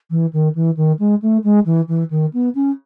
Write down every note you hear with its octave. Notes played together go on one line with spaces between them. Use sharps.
E3
D#3
E3
D#3
G#3
A3
G#3
E3
E3
D#3
B3
C#4